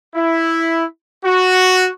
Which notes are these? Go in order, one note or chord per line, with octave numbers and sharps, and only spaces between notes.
E4
F#4